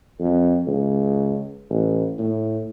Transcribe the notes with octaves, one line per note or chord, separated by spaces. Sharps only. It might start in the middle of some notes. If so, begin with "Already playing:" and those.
F2
C#2
A1
A2